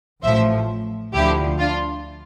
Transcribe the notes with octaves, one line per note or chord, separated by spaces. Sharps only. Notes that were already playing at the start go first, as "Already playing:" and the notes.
A1 A2 F3 C5 E5
D2 D3 F3 E4 G4
D4 F4